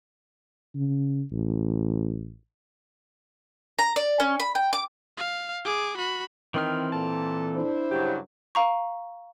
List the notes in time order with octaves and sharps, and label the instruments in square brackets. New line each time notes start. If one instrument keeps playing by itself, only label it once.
[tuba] C#3
A1
[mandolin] A#5
D5
C#4
B5
G5
D6
[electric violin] F5
G#4 D6
F#4 B5
[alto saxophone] D#3 [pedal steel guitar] E3 C4 F6
[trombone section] A#2 A4 [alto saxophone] A5
[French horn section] D4 E4 C5
[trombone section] G2 C#3 F#3 [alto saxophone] G4
[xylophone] F5 A#5 C#6